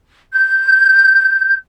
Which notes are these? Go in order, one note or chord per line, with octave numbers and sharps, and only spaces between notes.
G6